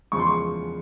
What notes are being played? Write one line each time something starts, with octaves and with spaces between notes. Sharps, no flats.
E2 C#3 F3 G#3 C#6
C6
C#6